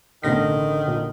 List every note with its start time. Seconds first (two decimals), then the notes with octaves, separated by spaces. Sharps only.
0.23 A1 B2 D3 D#3 A#6
0.88 A#2